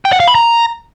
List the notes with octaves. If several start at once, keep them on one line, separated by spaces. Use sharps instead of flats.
G5
F#5
F5
B5
A#5